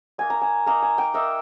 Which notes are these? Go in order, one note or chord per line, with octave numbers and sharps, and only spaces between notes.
A#3 D#4 G#5
A#5
G#5
A#3 D#4 A#5
G#5
G5
A#3 D#4 E5